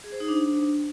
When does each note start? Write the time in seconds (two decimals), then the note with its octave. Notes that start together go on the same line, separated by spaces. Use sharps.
0.04 G#4
0.12 C5
0.20 D#4
0.28 D4